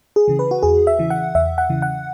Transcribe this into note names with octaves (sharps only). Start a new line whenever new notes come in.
G#4
C#3 E3
B4
F#4
E2 G#4
E5
C#3 E3
F#5
E2 E5
F#5
C#3 E3
F#5